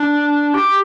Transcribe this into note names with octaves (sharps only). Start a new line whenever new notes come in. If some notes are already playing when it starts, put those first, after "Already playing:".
Already playing: D4
G4